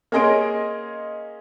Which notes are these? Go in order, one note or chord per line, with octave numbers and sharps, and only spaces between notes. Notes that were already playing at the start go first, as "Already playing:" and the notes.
A#3 C#4 G#4 D#5 C6 D7